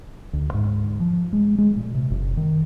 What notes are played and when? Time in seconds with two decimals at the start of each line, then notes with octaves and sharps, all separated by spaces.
0.33 D2
0.54 G#2
1.00 F3
1.33 G#3
1.58 G#3
1.76 A#2
1.95 C3
2.10 F#1
2.37 D#3